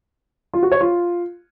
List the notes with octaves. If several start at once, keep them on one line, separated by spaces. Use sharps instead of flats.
F4
F#4
C#5
F4